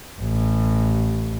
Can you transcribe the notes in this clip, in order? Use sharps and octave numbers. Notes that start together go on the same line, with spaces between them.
A1